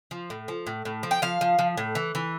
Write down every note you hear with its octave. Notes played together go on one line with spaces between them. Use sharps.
F3
A2
F3
A2
A2
F3
G5
F3 F5
F3
F3
A2
E3
E3